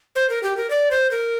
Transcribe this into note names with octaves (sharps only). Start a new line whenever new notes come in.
C5
A#4
G4
A#4
D5
C5
A#4